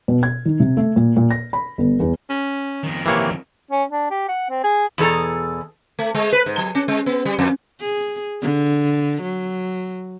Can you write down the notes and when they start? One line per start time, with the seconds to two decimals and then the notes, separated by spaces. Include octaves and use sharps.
0.08 B2
0.23 G#6
0.45 D#3
0.60 C3
0.77 A3
0.96 A#2
1.17 A#2
1.31 A#6
1.53 B5
1.78 G1
2.00 E2
2.29 C#4
2.83 F2 D#3
3.06 C3 E3 A#3 C#5
3.71 C#4
3.91 D4
4.10 G4
4.28 F#5
4.50 C4
4.64 G#4
4.98 E2 B2 G#4 A4 A#5
5.99 A3
6.15 G#3
6.32 B4
6.46 G#2
6.58 F#3
6.75 C#4
6.88 G#3
7.06 B3
7.26 G3
7.39 F2
7.80 G#4
8.41 D3
9.22 F#3